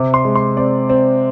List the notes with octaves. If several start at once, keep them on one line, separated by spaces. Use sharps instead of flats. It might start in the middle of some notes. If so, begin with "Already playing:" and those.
Already playing: C3 D6
C6
G#3
C6
C4 D5
C4